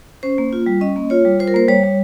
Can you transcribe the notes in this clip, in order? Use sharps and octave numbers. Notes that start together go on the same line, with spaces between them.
C#4 C5
A#3
F4
G3
C#4 D#5
A#3
F4 C#5
G3
F4 C5
A#4
A#3 C5
G3 C#5
G3